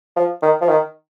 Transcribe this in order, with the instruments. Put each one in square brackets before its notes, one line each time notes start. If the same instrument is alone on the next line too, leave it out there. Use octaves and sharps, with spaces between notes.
[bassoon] F3
D#3
F3
D#3